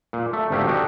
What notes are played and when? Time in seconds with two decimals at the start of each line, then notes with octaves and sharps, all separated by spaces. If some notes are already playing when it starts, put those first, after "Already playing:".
0.13 A#2
0.33 A3
0.50 G#1 D2 A3 A#3 G4 E5
0.67 D4 D#4 F#4 G4 A4